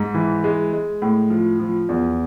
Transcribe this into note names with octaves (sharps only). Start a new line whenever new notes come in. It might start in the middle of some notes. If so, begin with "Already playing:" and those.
Already playing: G#2
E3
G#3
G#3
A2
F3
F3
E2